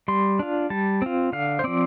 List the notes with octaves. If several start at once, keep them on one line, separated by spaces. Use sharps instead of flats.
G3 C6
D4 F4
G3 A5
C4 F4
D3 F5
C5
F3 C4 D5